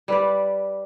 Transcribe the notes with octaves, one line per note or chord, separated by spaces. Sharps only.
G3 B4 D5